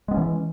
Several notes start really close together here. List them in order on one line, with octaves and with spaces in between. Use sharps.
G#3 B3 C#4 E3